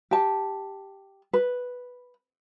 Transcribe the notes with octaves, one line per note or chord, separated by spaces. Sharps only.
G4 A5
B4